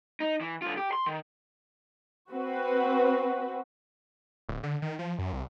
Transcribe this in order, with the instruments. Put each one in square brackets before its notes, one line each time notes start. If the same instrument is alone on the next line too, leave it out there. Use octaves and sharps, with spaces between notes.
[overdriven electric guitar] D#4
E3
D3 F4
G4
C6
D#3
[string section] C4 F#4 B4
[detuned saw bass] D1
D3
D#3
F3
F#2
C2